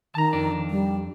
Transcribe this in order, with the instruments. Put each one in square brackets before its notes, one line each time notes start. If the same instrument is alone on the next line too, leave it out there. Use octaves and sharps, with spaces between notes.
[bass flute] D#3 [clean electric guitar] A5 A#5
[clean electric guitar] F2 D4
[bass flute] G3